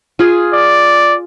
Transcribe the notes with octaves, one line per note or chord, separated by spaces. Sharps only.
F4 G#4
D5